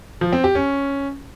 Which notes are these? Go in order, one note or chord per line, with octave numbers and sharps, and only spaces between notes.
F3
C4
G4
C#4